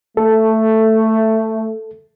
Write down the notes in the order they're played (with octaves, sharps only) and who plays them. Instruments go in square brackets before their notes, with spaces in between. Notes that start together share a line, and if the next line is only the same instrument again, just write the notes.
[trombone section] A3 [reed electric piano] A4